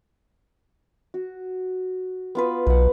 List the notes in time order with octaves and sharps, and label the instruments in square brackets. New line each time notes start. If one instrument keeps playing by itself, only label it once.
[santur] F#4
B3 F4 B4
[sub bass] B1 [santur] B4 F#5